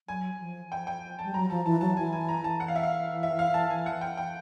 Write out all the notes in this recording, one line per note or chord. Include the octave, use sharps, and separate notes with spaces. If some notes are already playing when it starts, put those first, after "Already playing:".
F#3 G#5
F3
F3 G5
G5
G3 A5
F#3 A#5
F3 A5
E3 A5
F#3 A5
E3 G#5
G#5
A#5
A5
E3 F#5
F5
E5
F5
E5
F5
A5
G#5
F#5
G5
G5